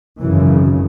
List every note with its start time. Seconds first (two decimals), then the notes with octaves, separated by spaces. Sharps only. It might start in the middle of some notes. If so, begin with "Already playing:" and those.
0.21 G#1 F#2 C#3 E3